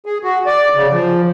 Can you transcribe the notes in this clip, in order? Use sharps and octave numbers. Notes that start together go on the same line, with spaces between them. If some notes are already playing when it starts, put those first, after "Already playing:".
G#4
F#4
D5
C#3
F3